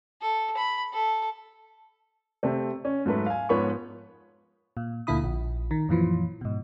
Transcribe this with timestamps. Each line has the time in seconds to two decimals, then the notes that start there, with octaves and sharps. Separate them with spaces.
0.22 A4
0.57 B5
0.94 A4
2.43 C3 A3 C4
2.85 C#4
3.06 G#2 F#3 A3 B4
3.26 F5 G#5
3.49 G#2 F3 B3 C#5 B5 C#6
4.77 A#2
5.07 D2 A#2 D3 E4 B5 D#6
5.24 A#1
5.71 D#3
5.89 F#2 A#2 E3 F3
6.41 G#2 B2